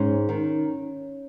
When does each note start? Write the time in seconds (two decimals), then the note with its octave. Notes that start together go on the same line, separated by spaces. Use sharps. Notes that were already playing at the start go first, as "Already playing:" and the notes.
Already playing: G#2 C#4
0.29 D#3